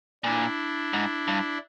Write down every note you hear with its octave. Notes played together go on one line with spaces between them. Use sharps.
A#2 D4 E4
G#2
G2